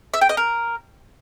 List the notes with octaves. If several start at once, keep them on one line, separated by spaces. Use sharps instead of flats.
E5
G5
D#5
A#4